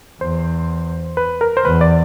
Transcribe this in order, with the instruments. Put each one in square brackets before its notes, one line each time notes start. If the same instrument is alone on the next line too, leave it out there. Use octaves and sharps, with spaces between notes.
[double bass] E2 [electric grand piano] C5
[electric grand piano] B4
A#4
C5
[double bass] E2 [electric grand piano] B4
[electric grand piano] D5